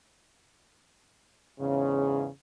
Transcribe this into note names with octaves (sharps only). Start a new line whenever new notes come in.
E2 G#2 C#3